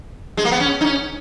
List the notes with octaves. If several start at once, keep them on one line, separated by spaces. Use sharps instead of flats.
G#3
A#3
B3
C#4
D#4
C#4